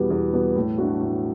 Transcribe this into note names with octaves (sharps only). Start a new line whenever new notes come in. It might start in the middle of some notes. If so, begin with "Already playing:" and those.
Already playing: E2 B2 G3 B3
E2
B2 G3 B3
A2
F#3 A3 D4 F#4
A2